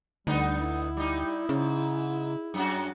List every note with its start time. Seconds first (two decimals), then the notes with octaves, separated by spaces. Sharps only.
0.27 D2 D3 G3 B3 D#4
0.60 E4
0.97 G3 D#4
1.49 G#2 C#3
2.54 F#2 C#4 F#4